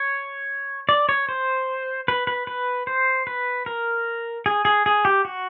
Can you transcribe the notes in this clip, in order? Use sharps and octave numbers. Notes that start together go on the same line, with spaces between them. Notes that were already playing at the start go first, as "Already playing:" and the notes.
Already playing: C#5
D5
C#5
C5
B4
B4
B4
C5
B4
A#4
G#4
G#4
G#4
G4
F#4